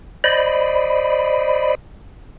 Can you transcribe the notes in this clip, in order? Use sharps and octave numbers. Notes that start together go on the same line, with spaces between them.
C5 D5 D#5 B5